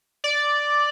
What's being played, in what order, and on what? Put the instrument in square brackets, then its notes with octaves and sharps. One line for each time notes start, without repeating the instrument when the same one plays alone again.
[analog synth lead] D5